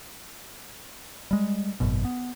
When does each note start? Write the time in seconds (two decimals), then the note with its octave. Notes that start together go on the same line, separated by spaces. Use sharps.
1.31 G3 G#3
1.80 G#1 F#2 B2
2.05 B3